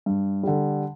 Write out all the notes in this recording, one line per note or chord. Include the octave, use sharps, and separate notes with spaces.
G2
D3 G3